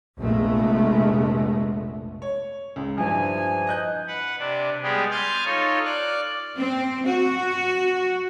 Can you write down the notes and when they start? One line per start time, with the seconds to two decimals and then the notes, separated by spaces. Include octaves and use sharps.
0.18 F1 A#1 G#3 A3 B3
2.22 C#5
2.76 C#2
2.97 G2 E3 F3 C5 G#5
3.67 D#5 F#6 G6
4.07 B4 F#5
4.39 C3 D4
4.82 G3 G#3 B3 G4 G#4
5.11 G#5 C6 F6 G6 A6
5.45 D#4 F4 A4 C#5
5.85 D5 F6 F#6
6.57 C4
7.07 F#4